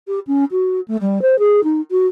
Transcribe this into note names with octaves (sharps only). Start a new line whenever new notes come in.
G4
C#4
F#4
A3
G3
C5
G#4
D#4
F#4